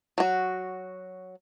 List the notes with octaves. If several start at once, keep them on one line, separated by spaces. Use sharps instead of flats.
F#3 F#4